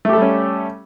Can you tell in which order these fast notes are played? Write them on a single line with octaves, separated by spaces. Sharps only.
A3 G4 A4 G3 C#4